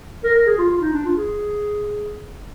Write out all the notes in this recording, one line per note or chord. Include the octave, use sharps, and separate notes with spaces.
A#4
A#4
G#4
F4
F4
D#4
D4
F4
G#4